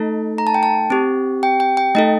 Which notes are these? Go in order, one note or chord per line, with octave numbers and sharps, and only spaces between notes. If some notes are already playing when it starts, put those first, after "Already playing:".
Already playing: A3 D#4 A4
A#5
A5
G5
A5
C4 G4
G5
G5
G5
A3 D#4 A4 D#5